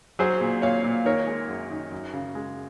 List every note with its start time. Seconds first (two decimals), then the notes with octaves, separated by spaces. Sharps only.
0.19 F#3 G#4 C5
0.41 A#2
0.62 A#2 C#5 F5
0.84 A#2
1.05 D#3 A#4 C#5
1.27 G#3
1.48 F#2
1.71 D#3
1.92 F#2
2.13 C#3
2.35 G#3